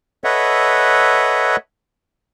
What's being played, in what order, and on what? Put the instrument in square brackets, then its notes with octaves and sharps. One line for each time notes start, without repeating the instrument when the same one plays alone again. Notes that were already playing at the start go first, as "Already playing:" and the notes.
[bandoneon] A4 B4 C#5 D#5 E5 F#5